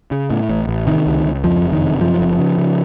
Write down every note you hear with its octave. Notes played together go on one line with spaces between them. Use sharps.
C#3
A2
A1
A1
C3 D#3
C#2
C#2
F2 F3
F#1
D#3
C3
F#2 F3
F#1
C#3
C#3